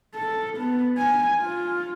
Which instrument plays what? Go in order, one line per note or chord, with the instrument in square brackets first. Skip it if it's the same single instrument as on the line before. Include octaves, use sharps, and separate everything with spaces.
[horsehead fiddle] A4
B3
G#5
F4